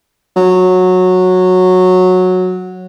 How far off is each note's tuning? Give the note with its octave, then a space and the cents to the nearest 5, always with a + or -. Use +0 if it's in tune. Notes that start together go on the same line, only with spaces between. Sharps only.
F#3 -10